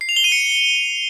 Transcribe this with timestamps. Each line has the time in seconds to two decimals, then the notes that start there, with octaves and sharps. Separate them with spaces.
0.01 C7
0.09 F7
0.16 G7
0.24 D#7
0.32 C#7